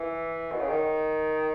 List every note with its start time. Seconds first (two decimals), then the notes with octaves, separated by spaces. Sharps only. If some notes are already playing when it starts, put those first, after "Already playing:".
Already playing: E3
0.52 B2
0.60 C#3
0.68 D#3